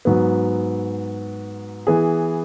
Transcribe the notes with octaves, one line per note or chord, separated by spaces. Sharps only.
G#2 F#3 B3
E3 B3 G#4